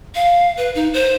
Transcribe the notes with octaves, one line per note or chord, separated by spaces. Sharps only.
F5
B4
D#4
C5